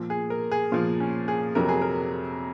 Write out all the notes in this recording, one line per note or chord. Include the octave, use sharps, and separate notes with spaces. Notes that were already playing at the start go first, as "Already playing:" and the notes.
Already playing: A#2 F3
G#4
A#4
G#4
A#2 F3 F4
C#4
G#4
F2 C3 F#3 A#4
G#4
A#4